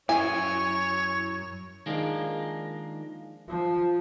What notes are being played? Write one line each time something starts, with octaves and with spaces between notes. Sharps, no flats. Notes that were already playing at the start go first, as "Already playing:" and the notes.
F#2 E4 C#5 G#5
D#3 F3 G#3 A#3 D4
F3